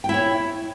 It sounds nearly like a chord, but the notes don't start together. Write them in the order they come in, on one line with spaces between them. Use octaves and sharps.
G5 E4 C#5